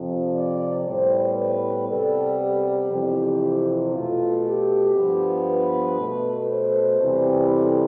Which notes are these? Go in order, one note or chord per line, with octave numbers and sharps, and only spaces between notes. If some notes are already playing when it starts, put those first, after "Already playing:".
Already playing: F2 C3 F3
D5
A2 G3 B3 C5
B4
C3 G3 B3 A4
G4
F2 C3 E3
B2 A3 F4
G4
G2 F3 B3
B4
B2 A3
C5
E2 C3 E3 G3
A4